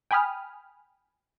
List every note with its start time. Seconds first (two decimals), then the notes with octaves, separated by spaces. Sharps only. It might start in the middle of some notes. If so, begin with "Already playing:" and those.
0.11 G5 G#5 B5 D#6 F6